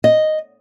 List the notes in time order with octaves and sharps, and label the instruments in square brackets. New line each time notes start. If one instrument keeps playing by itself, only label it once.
[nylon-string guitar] D#5